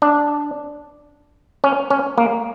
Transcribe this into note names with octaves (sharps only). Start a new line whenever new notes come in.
D4
C#4
C#4
A#3